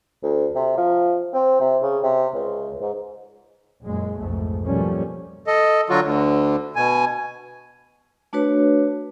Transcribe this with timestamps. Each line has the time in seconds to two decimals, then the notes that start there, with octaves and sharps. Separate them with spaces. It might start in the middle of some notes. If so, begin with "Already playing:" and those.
0.23 D2
0.55 C3
0.77 F3
1.34 C4
1.60 C3
1.82 C#3
2.03 C3
2.34 C#2
2.81 G#2
3.84 F#1 F#2 A#2 G#3
4.19 B1 F2 G#2 A3
4.64 B2 F3 G3 A3 A#3 C#4
5.47 A4 D#5
5.89 D3 F#3 F4 F#4
6.03 D2 D3
6.76 B2 G#5
8.33 A3 D4 F#4 B4 C#5